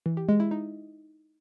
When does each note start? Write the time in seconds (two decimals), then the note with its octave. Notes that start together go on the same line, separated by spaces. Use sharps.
0.06 E3
0.17 G4
0.28 G#3
0.40 E4
0.51 D#4